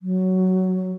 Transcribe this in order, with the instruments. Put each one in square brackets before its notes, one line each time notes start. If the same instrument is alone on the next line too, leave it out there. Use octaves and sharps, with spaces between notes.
[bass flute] F#3